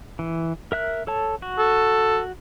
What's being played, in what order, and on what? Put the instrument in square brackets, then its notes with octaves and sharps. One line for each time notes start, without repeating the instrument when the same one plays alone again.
[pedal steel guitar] E3
A#4 E5 F#6
A4 C#5 A5
F#4
[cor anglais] A4